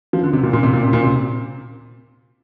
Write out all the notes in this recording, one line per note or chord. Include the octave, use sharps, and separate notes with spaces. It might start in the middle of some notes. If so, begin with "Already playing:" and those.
F3
D3
C3
A#2
A#2
C3
A#2
C3
A#2
C3